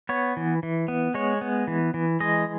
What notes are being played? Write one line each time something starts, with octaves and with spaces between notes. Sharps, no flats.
B3 C#5
E3
E3
B3
G#3 C#5
B3
E3
E3
G#3 D#5